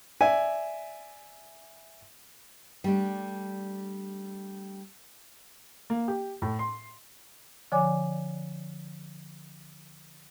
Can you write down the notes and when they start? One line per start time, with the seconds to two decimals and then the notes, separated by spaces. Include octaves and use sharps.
0.21 D5 E5 G#5
2.84 G3 A3 D4
5.90 A#3
6.08 G4
6.42 A2
6.59 C6
7.72 D3 F3 C#5 D5 G#5 D6